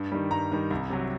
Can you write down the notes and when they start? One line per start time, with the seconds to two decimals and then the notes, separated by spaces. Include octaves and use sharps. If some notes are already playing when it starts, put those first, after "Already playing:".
Already playing: G2
0.12 D#3 G3
0.31 G2 A#5
0.52 D#3 G3
0.70 C2
0.90 C3 F#3